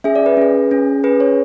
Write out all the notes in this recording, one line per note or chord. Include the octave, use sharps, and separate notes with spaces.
C#4 G#4 E5
D5
B4
C#4 G#4
C#4 G#4
C#4 G#4 B4
C#5